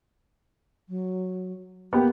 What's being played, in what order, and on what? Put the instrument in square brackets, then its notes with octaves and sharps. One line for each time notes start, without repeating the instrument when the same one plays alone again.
[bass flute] F#3
[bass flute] A#3 [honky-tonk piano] B3 G4